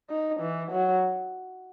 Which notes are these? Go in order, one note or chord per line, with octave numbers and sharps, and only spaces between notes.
D#4
E3
F#3